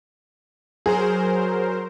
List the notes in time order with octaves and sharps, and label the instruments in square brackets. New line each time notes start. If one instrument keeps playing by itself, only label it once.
[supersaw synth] F#3 A#4 C5 [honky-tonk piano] G#4